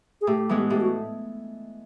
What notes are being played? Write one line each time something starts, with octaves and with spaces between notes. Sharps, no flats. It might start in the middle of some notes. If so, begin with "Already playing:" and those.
G#4
A2 G4
E3 G#3 B3
A2 G4
F#4